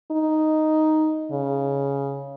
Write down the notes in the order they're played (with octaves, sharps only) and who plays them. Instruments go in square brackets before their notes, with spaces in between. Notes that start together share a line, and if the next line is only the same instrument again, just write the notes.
[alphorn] D#4
C#3